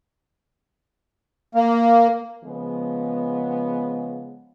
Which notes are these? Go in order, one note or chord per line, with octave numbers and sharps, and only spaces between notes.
A#3
C#3 F3 G#3 B3